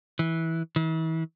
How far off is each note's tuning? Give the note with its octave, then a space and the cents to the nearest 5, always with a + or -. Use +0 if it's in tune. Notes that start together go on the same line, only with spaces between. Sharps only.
E3 -15
E3 -40